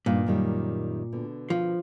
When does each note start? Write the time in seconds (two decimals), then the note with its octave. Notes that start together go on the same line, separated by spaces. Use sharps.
0.06 G2 A#2 D#3
0.26 F#2 D#3 G3
1.12 B2 D3
1.50 F3